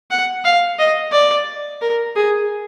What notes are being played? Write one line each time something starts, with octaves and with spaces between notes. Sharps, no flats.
F#5
F5
D#5
D5
A#4
G#4